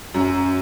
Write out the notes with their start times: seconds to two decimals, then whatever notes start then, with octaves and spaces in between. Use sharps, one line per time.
0.14 F#2